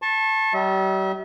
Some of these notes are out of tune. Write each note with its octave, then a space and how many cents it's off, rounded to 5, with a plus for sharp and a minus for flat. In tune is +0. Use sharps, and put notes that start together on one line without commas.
A5 +0 C#6 -40
G3 -40 E5 -40